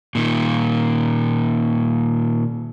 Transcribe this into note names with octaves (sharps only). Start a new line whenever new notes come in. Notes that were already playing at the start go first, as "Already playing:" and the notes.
A#2 D#3